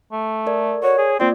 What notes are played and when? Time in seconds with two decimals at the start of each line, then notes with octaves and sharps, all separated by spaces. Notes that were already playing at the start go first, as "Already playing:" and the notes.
0.12 A3
0.46 A4 A#4 D5
0.83 F#4 C#5
0.98 G#4
1.20 A#3 C4 F4 D5